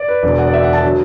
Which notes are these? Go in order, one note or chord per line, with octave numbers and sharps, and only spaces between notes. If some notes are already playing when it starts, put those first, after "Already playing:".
Already playing: D5
B4
E1 E2 D3 F#3 D5
F#5
D5
E5
F#5
A5
D3 F#3